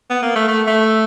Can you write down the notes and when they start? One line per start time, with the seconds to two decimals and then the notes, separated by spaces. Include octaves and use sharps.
0.10 B3
0.22 A#3
0.35 A3
0.48 A3
0.67 A3